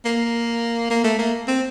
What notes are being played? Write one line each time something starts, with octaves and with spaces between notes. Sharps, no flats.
A#3
A#3
A3
A#3
C4